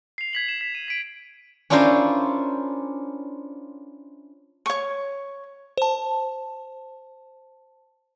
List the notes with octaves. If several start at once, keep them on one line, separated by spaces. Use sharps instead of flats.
C7 F7
G#6 B6 F#7
E7
B6
D#7
B6 D7
C#4 D4 E4 F4 A#4 C5
C#5 C#6
C5 A5